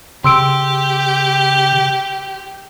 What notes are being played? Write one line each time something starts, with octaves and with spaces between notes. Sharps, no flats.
C#3 G4 C6 E6 D7